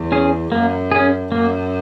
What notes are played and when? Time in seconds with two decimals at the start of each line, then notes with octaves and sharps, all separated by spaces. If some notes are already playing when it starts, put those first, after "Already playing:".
Already playing: E2
0.12 C#4 G#4
0.52 F#2 A#3
0.92 C#4 G#4
1.32 F#2 A#3